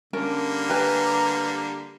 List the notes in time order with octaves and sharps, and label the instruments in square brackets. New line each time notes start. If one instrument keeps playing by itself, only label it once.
[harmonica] D3 G3 A#3 [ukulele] C#4 A#4 A5
[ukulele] G4 B4 G#5 [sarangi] A#5